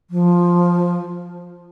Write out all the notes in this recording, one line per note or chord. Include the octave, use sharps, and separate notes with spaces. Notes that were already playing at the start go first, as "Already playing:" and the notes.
F3